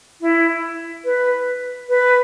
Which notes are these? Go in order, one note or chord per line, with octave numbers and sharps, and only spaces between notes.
E4
B4
B4